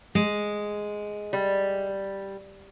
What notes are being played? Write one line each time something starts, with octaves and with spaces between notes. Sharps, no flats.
G#3
G3